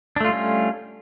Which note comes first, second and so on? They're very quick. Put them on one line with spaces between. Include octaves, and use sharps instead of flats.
D4 A3 F4 G3 C#4